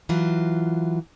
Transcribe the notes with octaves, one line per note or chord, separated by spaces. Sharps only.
E3 F#3 F4